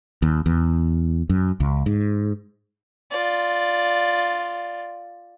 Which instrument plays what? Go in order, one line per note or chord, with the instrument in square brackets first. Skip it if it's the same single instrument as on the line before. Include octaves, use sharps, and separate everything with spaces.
[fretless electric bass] D#2
E2
F#2
C#2
G#2
[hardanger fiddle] F4 D5